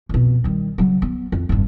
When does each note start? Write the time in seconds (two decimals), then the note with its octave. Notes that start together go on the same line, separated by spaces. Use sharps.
0.09 F2 B2
0.44 D#3 G3
0.78 C#3 F#3
1.02 B3
1.32 F2
1.49 F1 G2